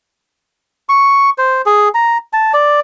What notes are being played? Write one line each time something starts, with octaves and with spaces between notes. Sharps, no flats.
C#6
C5
G#4
A#5
A5
D5